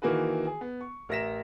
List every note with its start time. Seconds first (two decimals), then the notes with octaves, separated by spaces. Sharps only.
0.02 D#3 E3 A#3 F#4 G#4 B4
0.46 G#4
0.61 B3
0.81 C#6
1.09 A1 A#4 E5 A#6 B6 E7